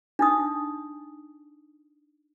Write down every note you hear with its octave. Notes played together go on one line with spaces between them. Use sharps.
D4 D#4 D#6